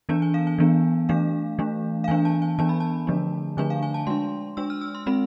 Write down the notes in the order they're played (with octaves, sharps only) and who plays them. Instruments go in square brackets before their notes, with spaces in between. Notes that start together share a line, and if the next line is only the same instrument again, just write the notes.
[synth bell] E3 B3 D4 A5
G#5
F5
G#5
E3 B3 D4
E3 A3 D4 F5
E3 A3 D4
F5
E3 B3 D4 G#5
A5
G#5
E3 B3 D4 A5
B5
A5
D3 F3 A3 D4
D3 F3 A3 D4 G#5
F5
G#5
A5
G#3 D4 C6
G#3 D4 E6
F6
E6
C6
G#3 C4 B5